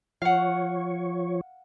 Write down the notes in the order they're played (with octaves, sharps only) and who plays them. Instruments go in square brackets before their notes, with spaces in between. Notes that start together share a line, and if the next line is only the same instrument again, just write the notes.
[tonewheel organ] F3 C#5 [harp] F5 F#5